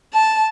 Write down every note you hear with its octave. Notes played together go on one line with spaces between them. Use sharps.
A5